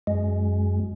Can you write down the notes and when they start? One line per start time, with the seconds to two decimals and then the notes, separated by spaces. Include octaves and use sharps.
0.07 F#2 G#3